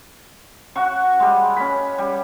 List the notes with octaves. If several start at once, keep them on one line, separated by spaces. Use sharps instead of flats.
F#4 F#5 C#6
G3 G#3
C#4 B5
G3